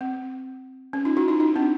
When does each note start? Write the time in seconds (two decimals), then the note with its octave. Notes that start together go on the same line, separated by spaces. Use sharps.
0.01 C4
0.93 C#4
1.05 D#4 F4
1.17 E4 F#4
1.28 D#4 F4
1.40 D#4 F4
1.56 C4 D4